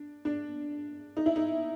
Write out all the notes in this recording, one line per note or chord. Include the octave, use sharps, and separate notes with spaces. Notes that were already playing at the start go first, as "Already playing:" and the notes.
Already playing: D4
D4
D#4
E4
D#4